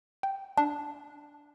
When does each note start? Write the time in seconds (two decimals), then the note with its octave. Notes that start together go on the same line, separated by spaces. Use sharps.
0.23 G5
0.57 D4